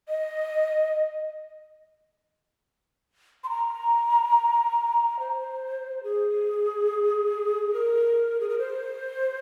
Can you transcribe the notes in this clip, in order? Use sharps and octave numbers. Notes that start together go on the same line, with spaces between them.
D#5
C6
A#5
C5
G#4
A#4
G#4
A#4
C5